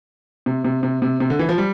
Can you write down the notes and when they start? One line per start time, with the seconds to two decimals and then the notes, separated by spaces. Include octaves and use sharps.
0.46 C3
0.65 C3
0.83 C3
1.02 C3
1.20 C3
1.30 D3
1.39 E3
1.49 F3
1.58 G3